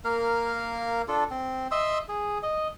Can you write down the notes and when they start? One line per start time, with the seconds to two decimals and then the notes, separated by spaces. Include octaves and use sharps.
0.04 A#3 A#4 F5
1.08 D4 F4 A4
1.30 C4
1.71 D#5 E5 C6 E6
2.09 G#4
2.43 D#5